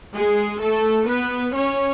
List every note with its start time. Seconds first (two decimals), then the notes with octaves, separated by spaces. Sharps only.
0.16 G#3 G#4
0.62 A3 A4
1.09 B3 B4
1.56 C#4 C#5